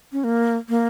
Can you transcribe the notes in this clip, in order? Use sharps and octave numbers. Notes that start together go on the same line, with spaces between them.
C#4
A#3
A#3